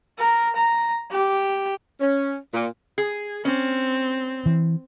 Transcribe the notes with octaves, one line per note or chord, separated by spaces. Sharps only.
A#4
A#5
G4
C#4
A#2
G#4
C4 C#4
E3